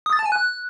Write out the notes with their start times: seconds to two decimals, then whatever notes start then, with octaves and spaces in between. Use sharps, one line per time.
0.06 D#6
0.13 A6
0.19 A5
0.25 G#5
0.32 F#6